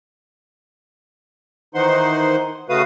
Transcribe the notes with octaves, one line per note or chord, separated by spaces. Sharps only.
D#3 E3 D#4 C5 F#5 C6
C#3 A3 F#4 B4 F5 D#6